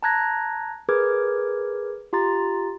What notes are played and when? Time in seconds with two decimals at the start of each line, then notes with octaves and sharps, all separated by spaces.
0.03 A5 A#5 F#6 G#6 A#6
0.89 G#4 A#4 B4 D6 F6 G#6
2.13 F4 G4 A#5 C6 A6